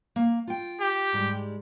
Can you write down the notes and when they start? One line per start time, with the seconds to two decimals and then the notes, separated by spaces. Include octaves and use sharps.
0.16 A#3
0.48 F4 G5
0.81 G4
1.13 G#2 G3 G#3